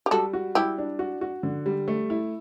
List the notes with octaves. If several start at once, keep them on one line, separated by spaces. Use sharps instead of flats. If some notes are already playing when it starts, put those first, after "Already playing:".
G4
G3 F#4 A4
F#4
G3 E4 G4
D4
F#4
F#4
D3
G3
A3
E4